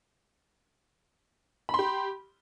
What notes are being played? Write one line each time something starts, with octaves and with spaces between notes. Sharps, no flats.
G4 B5 C6